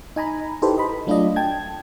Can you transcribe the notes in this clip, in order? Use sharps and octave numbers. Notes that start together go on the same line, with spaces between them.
D#4 G#5 A#5 B5
D#4 E4 G4 A4 B4 C5
D#5 B5
F#3 A3 D4 F4 D5 D#5
G5 A5 G#6